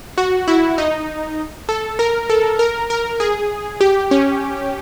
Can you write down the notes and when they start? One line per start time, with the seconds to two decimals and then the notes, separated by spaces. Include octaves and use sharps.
0.18 F#4
0.48 E4
0.78 D#4
1.69 A4
1.99 A#4
2.30 A4
2.59 A#4
2.90 A#4
3.20 G#4
3.81 G4
4.11 C#4